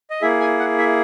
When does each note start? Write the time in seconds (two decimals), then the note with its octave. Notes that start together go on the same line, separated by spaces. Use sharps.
0.10 D#5
0.21 A#3 E4 G#4 E5
0.40 G#5
0.59 F#5
0.78 E5